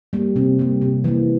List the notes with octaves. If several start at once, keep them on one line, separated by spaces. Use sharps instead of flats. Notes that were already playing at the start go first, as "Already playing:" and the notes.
G3 A#3
C3 C4
G3 A#3
C3
E3 A#3